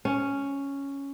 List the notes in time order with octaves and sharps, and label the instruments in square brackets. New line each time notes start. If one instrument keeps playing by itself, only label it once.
[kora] C#4